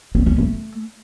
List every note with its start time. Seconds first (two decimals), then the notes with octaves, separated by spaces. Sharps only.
0.15 C4
0.26 C#4
0.38 A3